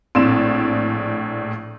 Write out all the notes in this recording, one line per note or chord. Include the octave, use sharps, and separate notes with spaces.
A#1 A2 C4 E7